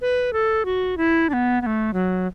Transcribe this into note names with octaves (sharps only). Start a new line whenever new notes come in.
B4
A4
F#4
E4
D4
B3
B3
A3
F#3